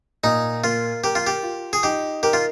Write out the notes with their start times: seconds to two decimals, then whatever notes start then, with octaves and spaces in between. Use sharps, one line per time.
0.23 A#2 D#4
0.64 A#3 F4
1.04 G4 A#4
1.15 F4
1.27 G4
1.43 F4
1.73 G#4
1.83 D#4 G4
2.23 G4 A#4
2.33 F4